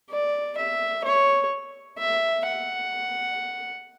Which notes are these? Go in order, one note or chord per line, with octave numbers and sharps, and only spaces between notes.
D5
E5
C#5
E5
F#5